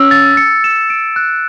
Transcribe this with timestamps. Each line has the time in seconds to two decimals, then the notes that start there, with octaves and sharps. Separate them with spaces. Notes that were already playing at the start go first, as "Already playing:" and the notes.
Already playing: C#4 E6
0.11 A6
0.37 C#7
0.64 E7
0.90 D7
1.16 F#6